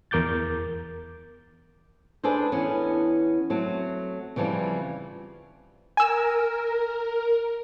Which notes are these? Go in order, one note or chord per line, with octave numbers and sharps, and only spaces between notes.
E2 A#4 D6 G6 A6
D4 G#4 A4 B4 C5
E2 B3 C#4
F#3 A3 C4
C#3 E3 F3 G3 C4
A#4 G#5 E6